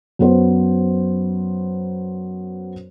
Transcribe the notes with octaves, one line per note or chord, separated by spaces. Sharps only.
F#2 B3 C5